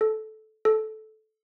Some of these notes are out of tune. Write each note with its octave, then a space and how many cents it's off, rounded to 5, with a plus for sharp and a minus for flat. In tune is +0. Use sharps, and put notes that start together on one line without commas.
A4 -15
A4 -15